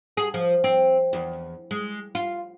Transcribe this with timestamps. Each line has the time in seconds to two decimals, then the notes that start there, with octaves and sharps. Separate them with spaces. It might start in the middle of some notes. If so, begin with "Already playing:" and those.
0.17 G#4
0.34 F3
0.64 C4
1.13 E2
1.71 G#3
2.15 F4